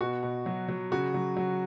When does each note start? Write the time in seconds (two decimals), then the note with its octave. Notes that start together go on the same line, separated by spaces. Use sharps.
0.01 B2 F#4
0.23 B2
0.46 F#3
0.68 F#3
0.91 C#3 F#4
1.14 F#3
1.37 F#3